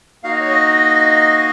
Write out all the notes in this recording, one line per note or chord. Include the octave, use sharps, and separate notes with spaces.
A#3 D#4 F#4 F5
D#5
C#5
D#5